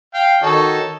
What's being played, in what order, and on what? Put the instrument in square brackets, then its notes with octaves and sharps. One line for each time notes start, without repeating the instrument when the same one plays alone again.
[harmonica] F5 G5
[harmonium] D#3 F#4 C#5 [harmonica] D#4 A4